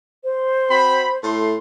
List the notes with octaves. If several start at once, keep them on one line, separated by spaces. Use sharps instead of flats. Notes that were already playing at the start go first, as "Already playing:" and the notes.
C5
C4 F#4 B5
A2 A3 C6